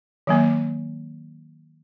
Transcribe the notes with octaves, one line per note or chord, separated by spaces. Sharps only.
D#3 F#3 A#3